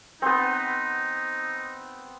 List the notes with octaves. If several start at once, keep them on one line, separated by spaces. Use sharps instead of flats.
B3 C4 D#4